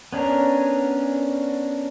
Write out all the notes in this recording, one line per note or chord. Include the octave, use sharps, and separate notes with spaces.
B3 C#4 D4 A#4